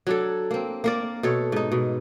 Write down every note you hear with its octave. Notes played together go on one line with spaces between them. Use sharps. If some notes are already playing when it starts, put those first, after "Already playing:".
F#3 D4 A4
A#3 C4
A#3 A#4 D5
B2 A4 C#5
G#2 D#4
B2